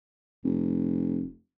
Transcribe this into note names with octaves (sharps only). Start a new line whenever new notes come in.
F1